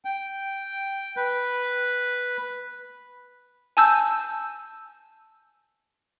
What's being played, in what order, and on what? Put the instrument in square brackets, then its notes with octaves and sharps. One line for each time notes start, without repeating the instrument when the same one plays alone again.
[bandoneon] G5
B4
[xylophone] G#5 A5 E6 G6